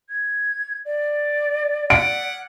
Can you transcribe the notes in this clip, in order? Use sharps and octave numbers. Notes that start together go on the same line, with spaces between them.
G#6
D5
F#5 D7